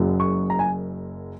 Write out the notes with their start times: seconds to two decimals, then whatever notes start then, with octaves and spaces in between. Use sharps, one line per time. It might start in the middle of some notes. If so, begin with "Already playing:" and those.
Already playing: F#1 F#2 C#3 F#3 A#3
0.20 C#6
0.50 A#5
0.59 G#5